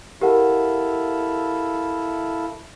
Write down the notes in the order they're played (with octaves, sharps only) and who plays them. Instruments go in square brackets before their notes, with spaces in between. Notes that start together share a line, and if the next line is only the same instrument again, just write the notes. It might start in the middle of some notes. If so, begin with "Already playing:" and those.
[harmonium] E4 A4 F5 [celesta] G4 A#4 F#5